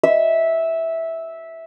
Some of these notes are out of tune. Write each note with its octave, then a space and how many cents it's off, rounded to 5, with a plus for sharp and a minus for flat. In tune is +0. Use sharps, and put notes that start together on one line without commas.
E5 -10